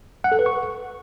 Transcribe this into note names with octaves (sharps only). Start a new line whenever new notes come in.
F#5
A4
B4
C#6